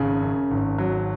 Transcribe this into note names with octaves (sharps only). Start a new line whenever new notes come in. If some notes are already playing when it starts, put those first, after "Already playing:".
Already playing: G#1 C#3 G#5
F#2
G#1
F#3